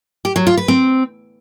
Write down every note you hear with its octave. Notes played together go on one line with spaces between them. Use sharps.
G4
F#3
F4
B4
C4